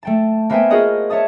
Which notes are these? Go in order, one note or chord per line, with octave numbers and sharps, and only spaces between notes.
A3 G5 A5
A#3 B3 C5 E5 G5 G#5
F4 F#4 G#4 A#4 D#5
C#5 E5 A5 D#6